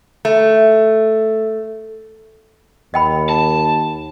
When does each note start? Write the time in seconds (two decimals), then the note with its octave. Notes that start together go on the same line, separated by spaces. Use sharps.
0.25 A3
2.94 D#2 D#5 G5 B5
3.30 A5